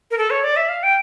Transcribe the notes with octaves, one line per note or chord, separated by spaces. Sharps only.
A#4
A4
C#5
D5
E5
F5
G5